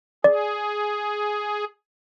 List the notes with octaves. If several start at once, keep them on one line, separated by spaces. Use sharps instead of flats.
G#4 D5